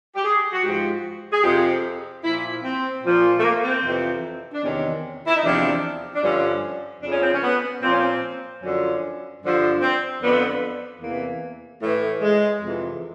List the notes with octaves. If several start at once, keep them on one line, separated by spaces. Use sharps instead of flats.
G4
G#4
F#4
G#2 F3 G4
G#4
F2 C3 F3 G4
A#2 F3 E4
C4
A#2 F3
A3
A#3
C4
F2 C3 E3
D4
E2 C3 D#3 C#4
E4
D#4
E2 C3 F3 D4
D4
G2 D3 F3 C#4
F2 C#3 F3 D4
C#4
C4
C#4
B3
A#2 F3 C4
C#4
C4
F#2 D3 F3 C#4
G2 D3 F3
C4
F2 D3 F3 B3
E2 C3 E3 A#3
A2 E3 A3
G#3
F2 C3 E3